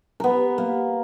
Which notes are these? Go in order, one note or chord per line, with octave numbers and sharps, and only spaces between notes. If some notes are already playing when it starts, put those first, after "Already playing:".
B3 A#4
A#3